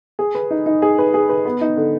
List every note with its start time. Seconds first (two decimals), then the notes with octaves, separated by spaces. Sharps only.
0.19 G#4
0.35 B4
0.51 D#4
0.66 D#4
0.82 G#4
0.98 B4
1.14 G#4
1.29 B4
1.45 B3
1.61 D#4
1.77 D3